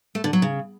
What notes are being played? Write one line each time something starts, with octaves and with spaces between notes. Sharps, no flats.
A3
D3
F#3
C#3